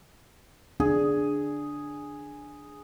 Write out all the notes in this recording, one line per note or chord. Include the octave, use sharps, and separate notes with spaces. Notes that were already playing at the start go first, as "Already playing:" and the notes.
D4 G#4